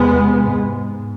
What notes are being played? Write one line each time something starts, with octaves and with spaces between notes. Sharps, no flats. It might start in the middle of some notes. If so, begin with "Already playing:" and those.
Already playing: E2 C3 G#3 B3
G#2